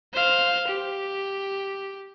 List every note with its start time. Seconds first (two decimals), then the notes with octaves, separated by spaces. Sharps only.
0.13 C5 F5
0.68 G4